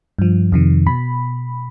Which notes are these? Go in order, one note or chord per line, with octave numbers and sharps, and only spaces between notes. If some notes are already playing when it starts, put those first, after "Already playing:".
G2 F3
F2 C3 D#3
B2 B5